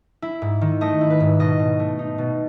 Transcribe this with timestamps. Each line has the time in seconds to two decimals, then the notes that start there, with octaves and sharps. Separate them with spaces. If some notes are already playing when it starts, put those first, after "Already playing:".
0.22 E4
0.42 G#2
0.61 D#3
0.81 A3 D#5
1.01 E4
1.10 B4
1.20 G#2
1.39 B2 D#5
1.59 B2
1.79 A3
1.99 D#4
2.18 B2